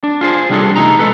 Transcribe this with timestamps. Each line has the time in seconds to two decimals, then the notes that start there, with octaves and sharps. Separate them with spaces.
0.04 D4
0.21 F4 G#4 C5
0.50 C3 G3 D4 D#4 G#4 A4
0.76 C3 E3 A3 D#4 A#5
0.99 B1 G#3 A4 B4